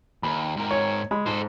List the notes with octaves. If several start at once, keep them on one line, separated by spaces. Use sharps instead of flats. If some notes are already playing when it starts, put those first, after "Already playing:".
D#2 B5
G#2 A#4
C#5
G#3 B5
G#2 A4 C5